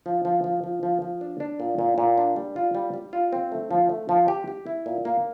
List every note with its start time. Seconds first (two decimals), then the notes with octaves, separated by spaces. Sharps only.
0.06 F3
0.25 F3
0.44 F3
0.64 F3
0.83 F3
1.02 F3
1.21 D4
1.40 D4
1.60 A#2
1.79 A#2
1.98 A#2
2.18 D4
2.36 G3
2.56 F4
2.75 G3
2.94 G3
3.13 F4
3.33 C4
3.52 A3
3.71 F3
3.89 A3
4.09 F3
4.28 G4
4.48 G4
4.66 E4
4.86 A#2
5.05 A#3